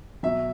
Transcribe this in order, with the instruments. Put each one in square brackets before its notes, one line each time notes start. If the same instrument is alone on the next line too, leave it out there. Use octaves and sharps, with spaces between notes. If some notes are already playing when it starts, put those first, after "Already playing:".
[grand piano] B2 F#3 E5